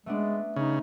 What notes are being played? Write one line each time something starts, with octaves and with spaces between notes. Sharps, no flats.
G#3 A3 B3 D4
C#3 D#4